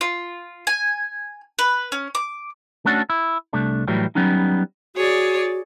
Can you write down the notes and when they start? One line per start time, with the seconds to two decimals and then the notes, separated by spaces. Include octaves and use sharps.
0.01 F4
0.67 G#5
1.59 B4
1.92 C#4
2.15 D6
2.85 A3 C#4 D4 F#4 A4
3.10 E4
3.53 C2 A3 D4
3.88 A2 E3 F#3 G3
4.15 F#3 G3 B3 C#4 D#4
4.96 F#4 G#4 C#5 D5